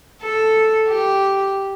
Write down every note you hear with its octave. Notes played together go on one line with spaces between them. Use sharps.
A4
G4